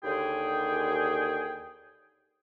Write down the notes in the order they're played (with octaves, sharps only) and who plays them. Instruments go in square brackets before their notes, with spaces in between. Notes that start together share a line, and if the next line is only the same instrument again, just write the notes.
[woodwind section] D#2 D3 G#4 G5